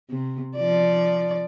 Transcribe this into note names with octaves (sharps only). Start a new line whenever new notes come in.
C3
F3 D5